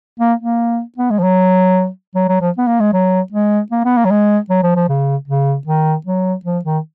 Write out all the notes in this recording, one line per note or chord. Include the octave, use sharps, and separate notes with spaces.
A#3
A#3
B3
G#3
F3
F#3
F#3
F#3
F3
B3
A#3
G#3
F#3
G#3
A#3
B3
A#3
F#3
G#3
F#3
F3
F3
C#3
C#3
D#3
F#3
F3
D#3